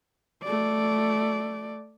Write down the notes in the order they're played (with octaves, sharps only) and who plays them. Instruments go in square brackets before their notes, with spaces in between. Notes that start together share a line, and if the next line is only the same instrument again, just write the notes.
[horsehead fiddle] A3 D5